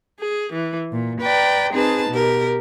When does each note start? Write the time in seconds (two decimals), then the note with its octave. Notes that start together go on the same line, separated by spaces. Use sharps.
0.20 G#4
0.53 E3
0.92 A#2
1.21 B4 D5 G5 A#5
1.72 C4 D#4 G#4 B4 A5
2.10 B2 G4 A#4